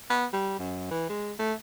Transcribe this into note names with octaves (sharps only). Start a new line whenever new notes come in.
B3
G3
F#2
E3
G#3
A3